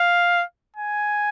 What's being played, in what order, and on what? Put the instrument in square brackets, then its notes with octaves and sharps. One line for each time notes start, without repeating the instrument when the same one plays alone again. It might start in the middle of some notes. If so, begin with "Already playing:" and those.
Already playing: [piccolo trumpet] F5
G#5